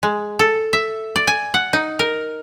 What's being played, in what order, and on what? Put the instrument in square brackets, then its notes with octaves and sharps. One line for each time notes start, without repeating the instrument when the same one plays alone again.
[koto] G#3
A4
E5
D5
G#5
F#5
D#4
A#4